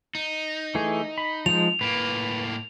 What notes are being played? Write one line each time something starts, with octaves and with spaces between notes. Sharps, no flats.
D#4
E3 A3 G#4
B5
F3 G#3 F7
A2 A#3 B4